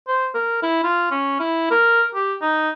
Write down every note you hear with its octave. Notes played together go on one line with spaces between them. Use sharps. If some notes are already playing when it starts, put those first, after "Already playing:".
C5
A#4
E4
F4
C#4
E4
A#4
G4
D#4